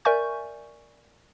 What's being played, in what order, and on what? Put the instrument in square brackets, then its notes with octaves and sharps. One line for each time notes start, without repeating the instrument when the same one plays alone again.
[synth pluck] A#4 D5 E5 G#5 C#6 G6